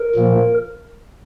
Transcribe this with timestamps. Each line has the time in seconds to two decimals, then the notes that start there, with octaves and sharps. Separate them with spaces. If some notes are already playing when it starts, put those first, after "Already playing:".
Already playing: A#4
0.15 A#2 F3 A#3